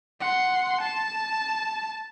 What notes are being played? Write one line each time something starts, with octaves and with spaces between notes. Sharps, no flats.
F#5 C6
A5